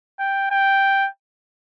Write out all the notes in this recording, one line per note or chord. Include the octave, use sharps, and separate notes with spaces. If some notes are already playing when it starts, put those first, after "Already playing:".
G5
G5